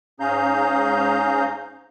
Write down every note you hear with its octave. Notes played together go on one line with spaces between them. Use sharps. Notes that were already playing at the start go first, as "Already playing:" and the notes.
G#2 C#4 G#4 F5 A#5 G6